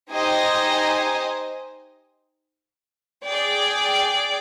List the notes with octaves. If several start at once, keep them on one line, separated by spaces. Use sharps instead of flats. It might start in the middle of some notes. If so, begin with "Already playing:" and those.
D#4 G4 C5 D#5 G#5
G#4 D5 G5